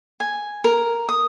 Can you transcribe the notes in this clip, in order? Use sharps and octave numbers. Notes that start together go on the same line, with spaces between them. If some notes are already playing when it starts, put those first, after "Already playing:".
G#5
A#4
D#6